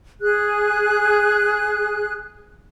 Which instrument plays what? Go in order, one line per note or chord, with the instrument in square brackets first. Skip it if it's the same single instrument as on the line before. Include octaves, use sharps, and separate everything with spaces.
[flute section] G#4 F#6